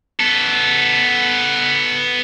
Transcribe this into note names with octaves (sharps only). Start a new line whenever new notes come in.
B3 A4